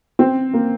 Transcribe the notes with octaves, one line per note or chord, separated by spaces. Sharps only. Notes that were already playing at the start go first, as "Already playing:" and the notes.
C4
A#3